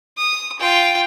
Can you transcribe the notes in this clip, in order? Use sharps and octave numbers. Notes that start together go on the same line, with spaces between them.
D#6
F4 G5